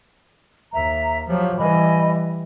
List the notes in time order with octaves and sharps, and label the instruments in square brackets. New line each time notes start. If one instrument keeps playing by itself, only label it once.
[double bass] D#2 [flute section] E5 A#5
[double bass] F3 F#3 [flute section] G4
[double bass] E3 G3 [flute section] D#5 G#5 B5